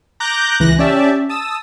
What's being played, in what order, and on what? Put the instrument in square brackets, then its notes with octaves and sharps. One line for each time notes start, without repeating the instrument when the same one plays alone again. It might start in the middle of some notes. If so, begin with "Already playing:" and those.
[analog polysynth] A#5 D6 F#6 G6 A#6
C#2 E3 F#6 A#6
C#4 G4 D5 E5 A5
A5 D#6 E6